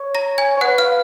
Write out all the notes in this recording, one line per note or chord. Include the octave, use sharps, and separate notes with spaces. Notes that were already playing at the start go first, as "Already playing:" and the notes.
Already playing: C#5
A#5 A#6
G#5 G#6
C#5
B4 F#5 F#6
F5 F6